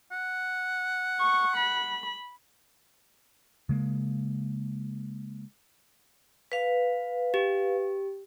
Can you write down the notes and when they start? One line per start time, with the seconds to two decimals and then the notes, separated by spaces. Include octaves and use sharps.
0.12 F#5
1.20 C#6
1.56 B5
3.69 C#3 G#3 A#3
6.52 B4 F5
7.34 G4